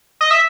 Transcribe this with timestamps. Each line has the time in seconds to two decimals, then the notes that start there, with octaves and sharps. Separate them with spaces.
0.21 D#5
0.31 E5